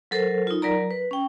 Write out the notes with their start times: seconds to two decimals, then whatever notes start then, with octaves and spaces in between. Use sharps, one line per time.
0.11 F#3 A4 A#4 C5
0.47 D#4 F4
0.62 F#3 A#4 D5 A#5
0.91 B4
1.11 C#4 G5